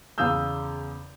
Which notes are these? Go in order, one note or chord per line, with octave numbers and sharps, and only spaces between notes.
E2 C#3 F5 D#6 E6 G6